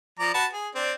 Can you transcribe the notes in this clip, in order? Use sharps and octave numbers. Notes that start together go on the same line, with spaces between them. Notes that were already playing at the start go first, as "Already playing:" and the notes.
F3 D5 A#5
F#4 B4 A5
G#4
C4 D4